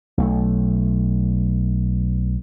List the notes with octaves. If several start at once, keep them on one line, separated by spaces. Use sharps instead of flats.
B1 A3